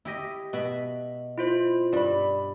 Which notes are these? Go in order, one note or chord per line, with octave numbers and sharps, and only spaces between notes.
E4 G4 D#5
B2 E5 B5
E4 F4 C5
G2 D5 B5